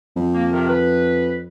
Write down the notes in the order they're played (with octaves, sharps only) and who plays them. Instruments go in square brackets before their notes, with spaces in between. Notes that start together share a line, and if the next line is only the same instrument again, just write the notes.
[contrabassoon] F2
[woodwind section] A#3
C3 D#3
B4